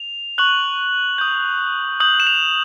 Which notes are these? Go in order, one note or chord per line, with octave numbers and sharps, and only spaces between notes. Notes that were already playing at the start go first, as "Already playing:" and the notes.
Already playing: F7
C#6 F#6 F#7
D#6 G6
D#6 G6 F#7
E7
F7